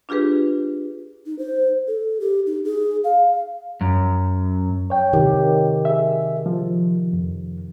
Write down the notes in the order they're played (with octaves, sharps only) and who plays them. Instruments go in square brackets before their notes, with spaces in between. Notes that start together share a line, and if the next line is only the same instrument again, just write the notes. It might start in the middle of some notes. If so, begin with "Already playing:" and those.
[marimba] D4 F4 G4 G#4 B4
[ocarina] D#4
C5
A4
G4
D#4
G#4
F5
[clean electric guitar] F#2
[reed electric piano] C#5 G5
[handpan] C3 D#3 G4
[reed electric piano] G#4 E5
F3
F2